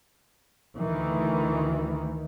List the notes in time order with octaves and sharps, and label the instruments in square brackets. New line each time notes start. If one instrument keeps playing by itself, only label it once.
[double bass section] D2 D#3 E3